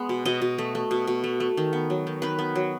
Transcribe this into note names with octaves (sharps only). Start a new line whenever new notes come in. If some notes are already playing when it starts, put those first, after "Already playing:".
Already playing: G#3 B3
B2
B2 D#5
B2
A3
A3
B2
B2
A3
A3
D#3
B3
F#3
D#3
D#3 B4
B3
F#3